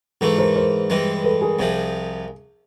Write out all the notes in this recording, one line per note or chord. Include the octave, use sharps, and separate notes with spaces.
G#2 E3 A3 A4 B4
A#4 C5
A#4 C5
G2 E3 G#3
A4 B4
G#4 A#4
C2 C3 F3